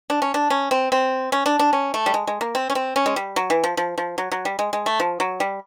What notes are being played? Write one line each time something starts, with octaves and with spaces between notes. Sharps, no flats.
D4
C#4
D4
C#4
C4
C4
C#4
D4
D4
C#4
A3
G3
G#3
G#3
A#3
C4
C#4
C4
C#4
G#3
G3
F#3
E3
F3
F3
F3
F#3
F#3
G3
G#3
G#3
A3
F3
F#3
G3